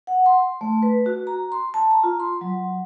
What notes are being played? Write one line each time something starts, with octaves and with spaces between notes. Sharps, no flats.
F#5
C6
A3
B4
F#4
A#5
C6
A5
A#5
F4
C6
F#3